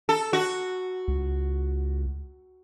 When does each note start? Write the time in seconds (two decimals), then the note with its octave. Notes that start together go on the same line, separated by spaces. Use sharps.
0.09 A4
0.33 F#4
1.08 C#2